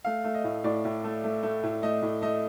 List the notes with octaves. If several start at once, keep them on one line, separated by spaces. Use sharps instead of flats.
A3 F5
A3
D#5
A2
A2 D5
A2
A3
A3
A3
A2
A3 D#5
A2
A3 D#5